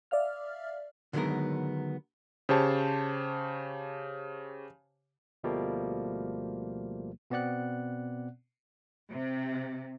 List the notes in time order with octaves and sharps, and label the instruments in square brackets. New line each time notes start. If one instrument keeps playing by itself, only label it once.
[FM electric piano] D5 E5 F5 F6
[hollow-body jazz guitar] D3 D#3 F#3 G#3 B3 A#4
[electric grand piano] C#3 G4 C5 C#5 A5
[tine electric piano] D2 B2 F3 G3 A3 A#3
B2 B3 C4 D5 F#5 F#6
[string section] C3